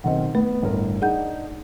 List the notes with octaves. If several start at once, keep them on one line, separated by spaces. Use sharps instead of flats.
B1 D#3 C4 D#5 F#5
A3 B3
G1 A2 A#4
D4 D#4 G#4 F#5 G6